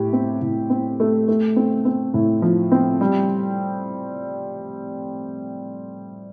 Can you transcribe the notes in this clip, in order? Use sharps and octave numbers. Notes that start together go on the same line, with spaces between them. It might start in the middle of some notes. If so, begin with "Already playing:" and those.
Already playing: A2 G4
C4
A2
C4
A3
A3
C4
C4
A2
F3
C4
G3